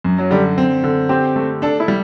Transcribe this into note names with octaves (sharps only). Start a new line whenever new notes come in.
F#2
F#3
D3 G3
C4
D3
C4 G4
A3
D4 A4
E4
G3